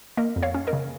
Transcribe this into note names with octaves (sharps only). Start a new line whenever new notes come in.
A#3 A#4 D#5
F2
C#5 F5
C#4
A#4 D#5
C#3